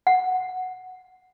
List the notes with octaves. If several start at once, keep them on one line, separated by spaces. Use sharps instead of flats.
F#5